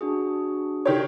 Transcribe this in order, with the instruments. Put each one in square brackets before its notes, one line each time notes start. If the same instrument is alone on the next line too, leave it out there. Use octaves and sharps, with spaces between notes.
[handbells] D4 F#4 G#4
[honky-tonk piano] D#3 G4 C#5